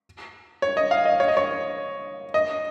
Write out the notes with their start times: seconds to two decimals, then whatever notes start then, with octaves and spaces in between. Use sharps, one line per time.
0.62 C#5
0.77 D#5
0.91 F5
1.05 D#5
1.20 C#5
1.28 D#5
1.37 C#5
2.34 D#5